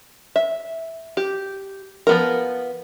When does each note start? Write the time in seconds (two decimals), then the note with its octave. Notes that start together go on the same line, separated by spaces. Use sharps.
0.36 E5
1.17 G4
2.07 F3 B3 A#4